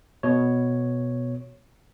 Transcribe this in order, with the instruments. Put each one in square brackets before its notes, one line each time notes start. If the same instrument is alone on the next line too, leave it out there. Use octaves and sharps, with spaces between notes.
[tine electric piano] B2 C#5